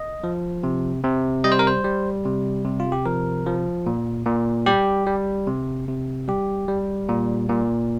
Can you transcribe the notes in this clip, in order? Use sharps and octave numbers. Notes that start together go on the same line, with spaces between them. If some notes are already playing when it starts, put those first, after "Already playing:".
Already playing: D#5
F3
C3
C3
G3 D#5
C5
A#4
C5
G3
C3
C3
F4
G4
F3 A#4
F3
A#2
A#2
G3 G4
G3
C3
C3
G3 G4
G3
A#2
A#2